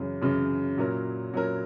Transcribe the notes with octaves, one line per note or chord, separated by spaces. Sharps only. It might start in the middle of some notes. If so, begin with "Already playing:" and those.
Already playing: F#2 C#3 E3
F#2 C#3 E3
A#2 F#3 C#4 E4 A#4
A#2 F#3 C#4 E4 A#4